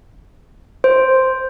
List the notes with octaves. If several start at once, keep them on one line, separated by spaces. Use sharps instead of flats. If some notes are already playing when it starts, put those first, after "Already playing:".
C5